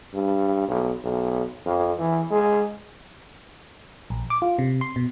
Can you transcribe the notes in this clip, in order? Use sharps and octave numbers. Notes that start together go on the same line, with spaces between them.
G2
B1
B1
F2
E3
G#3
A#1
D6
F4
C3
C6
B2